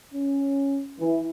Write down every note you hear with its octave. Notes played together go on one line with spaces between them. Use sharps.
C#4
E3